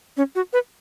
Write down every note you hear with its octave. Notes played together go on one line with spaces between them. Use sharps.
C#4
F#4
B4